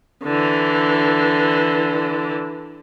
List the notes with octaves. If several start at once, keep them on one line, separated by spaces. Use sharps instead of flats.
D3 E3